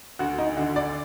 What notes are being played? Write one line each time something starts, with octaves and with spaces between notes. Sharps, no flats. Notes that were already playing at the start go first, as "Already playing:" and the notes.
D2 F#4
D#4
D3 F#4
D5